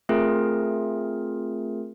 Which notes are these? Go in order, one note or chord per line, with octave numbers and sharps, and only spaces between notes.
A3 C4 F4 G#4 A#4